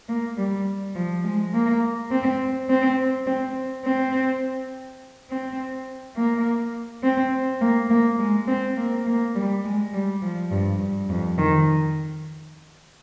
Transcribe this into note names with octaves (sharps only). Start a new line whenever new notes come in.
A#3
G3
F3
G#3
A#3
C4
C4
C4
C4
C4
A#3
C4
A#3
A#3
G#3
C4
A#3
A#3
G3
G#3
G3
F3
G2
G2
F2
D#3